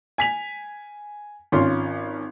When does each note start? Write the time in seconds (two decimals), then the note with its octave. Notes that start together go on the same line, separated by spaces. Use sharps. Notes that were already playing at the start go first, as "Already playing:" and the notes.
0.18 G#5 B6 F7
1.52 G#1 C#4 F4 C6